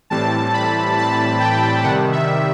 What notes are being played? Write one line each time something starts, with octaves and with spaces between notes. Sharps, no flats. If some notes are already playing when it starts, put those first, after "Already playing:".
A2 E3 G3 C4 A5
B5
A5
G5
C3 D#3 G3 F#5
E5